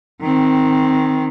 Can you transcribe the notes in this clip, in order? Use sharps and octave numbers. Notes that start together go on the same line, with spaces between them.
D#3 C4